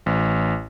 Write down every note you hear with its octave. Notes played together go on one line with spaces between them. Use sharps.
A1